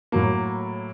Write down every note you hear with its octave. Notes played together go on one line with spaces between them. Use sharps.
A2 F#3 A#3